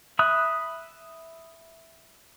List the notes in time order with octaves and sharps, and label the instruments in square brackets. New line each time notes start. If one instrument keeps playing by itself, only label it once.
[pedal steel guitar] E5 B5 D#6 F#6